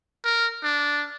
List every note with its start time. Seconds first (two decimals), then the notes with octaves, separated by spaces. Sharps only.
0.24 A#4
0.63 D4